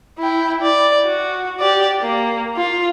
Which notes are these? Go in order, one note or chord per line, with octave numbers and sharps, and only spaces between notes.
E4 G5
D5
F#4
G4 D5
A#3
F4